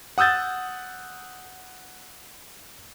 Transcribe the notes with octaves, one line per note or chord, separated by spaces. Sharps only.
F#5 D#6 E6 G6 A6